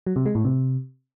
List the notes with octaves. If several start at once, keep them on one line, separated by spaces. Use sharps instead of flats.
F#3
C3
G#3
A2
C3